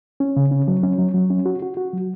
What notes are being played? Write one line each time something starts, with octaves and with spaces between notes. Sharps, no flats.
C#4
C#3
C#4
F#3
C#4
F#3
F#3
C#4
F#4
F#4
F#4
F#3